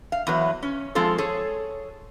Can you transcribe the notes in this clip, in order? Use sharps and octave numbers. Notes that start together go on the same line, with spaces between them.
F5
E2 F#3 B4
C#4
F3 G#3 C4 F4 A4
G#4 A4 C#5